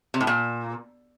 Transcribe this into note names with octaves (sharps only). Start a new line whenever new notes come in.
C3
A2
A#2